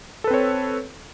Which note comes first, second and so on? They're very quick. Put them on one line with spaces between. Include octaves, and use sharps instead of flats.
A4 B4 C4 C#5